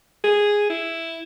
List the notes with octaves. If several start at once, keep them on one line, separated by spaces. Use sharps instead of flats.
G#4
E4